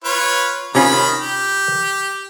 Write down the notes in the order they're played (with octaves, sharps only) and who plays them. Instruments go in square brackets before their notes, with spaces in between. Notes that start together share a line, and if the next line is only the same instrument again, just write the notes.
[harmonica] F4 B4 C#5
[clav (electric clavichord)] C3 C#4 F4 [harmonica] D#3 B5
[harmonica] G4